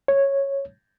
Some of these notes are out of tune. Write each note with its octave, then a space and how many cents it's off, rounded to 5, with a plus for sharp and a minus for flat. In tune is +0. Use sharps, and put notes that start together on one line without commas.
C#5 -10